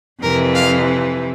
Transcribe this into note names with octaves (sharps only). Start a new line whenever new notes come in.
F2 C3 E3 A#4
F5